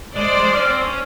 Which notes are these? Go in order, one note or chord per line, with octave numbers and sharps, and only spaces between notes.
G#3 C5 D5
G#3
C#4
C4
C#4